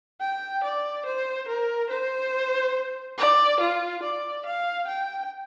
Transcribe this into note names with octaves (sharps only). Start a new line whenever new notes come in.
G5
D5
C5
A#4
C5
D5
F4
D5
F5
G5